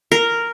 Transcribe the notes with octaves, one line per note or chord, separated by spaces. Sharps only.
A#4